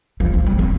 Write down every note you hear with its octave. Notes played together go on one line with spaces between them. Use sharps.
F3
F3
G3
C4